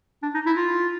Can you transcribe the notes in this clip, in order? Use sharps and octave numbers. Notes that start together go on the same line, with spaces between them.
D4
D#4
E4
F4